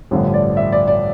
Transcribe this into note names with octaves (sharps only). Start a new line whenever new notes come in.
A1 G2 D3 F3
D5
E5
D5
D5